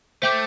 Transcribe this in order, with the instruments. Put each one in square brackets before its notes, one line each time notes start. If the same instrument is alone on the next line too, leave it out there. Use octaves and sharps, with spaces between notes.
[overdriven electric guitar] A3 [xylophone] C5 E5 G5 D6 G6